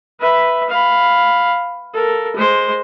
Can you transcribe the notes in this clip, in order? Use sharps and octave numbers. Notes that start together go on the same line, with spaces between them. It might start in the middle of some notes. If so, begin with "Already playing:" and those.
B4 E5
F5 B5
A4 A#4
G#3 C5